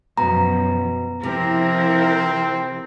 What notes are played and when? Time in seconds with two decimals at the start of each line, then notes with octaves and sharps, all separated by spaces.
0.17 F#2 B2 F3 A#5
1.23 C3 F3 C4 E4 A#4